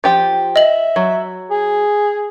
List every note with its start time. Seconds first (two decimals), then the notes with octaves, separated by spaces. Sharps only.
0.04 F3 G4 G5
0.56 D#5 E5 F#7
0.96 F#3
1.51 G#4